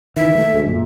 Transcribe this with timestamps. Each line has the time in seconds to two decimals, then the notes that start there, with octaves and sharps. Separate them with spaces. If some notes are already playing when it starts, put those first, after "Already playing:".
0.16 D#3 E3 E5
0.35 G#3 A3
0.54 D2 G#3
0.67 F#2 A#2